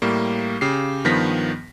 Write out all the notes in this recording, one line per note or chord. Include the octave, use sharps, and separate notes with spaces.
A2 G3 A#3
C#3 G4 C7
G2 D#3 F3 B3 A#6 B6